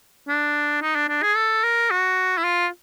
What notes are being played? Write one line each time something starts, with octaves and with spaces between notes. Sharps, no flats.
D4
D#4
D4
D4
G#4
A4
A#4
F#4
E4
F4